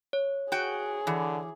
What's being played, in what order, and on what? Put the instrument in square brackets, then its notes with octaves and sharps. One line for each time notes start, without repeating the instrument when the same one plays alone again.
[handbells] C#5
[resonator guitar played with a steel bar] F#4 G5 [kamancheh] G#4
[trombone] D3 [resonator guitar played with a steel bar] E3